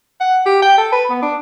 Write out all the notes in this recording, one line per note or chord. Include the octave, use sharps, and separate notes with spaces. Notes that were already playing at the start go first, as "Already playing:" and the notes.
F#5
G4
G5
A4
B4
B3
D4